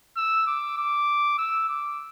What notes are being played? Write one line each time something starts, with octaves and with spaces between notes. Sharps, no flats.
E6
D6
D6
E6
D6